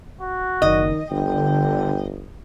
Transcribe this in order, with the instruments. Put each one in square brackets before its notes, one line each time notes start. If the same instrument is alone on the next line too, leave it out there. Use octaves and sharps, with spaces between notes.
[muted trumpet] F#4
[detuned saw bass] F#1 [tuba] D#3 [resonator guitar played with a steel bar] D#5
[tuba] G1 [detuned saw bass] D3 [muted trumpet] G5